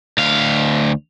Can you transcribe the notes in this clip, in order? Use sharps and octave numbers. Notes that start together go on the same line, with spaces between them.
D2 F5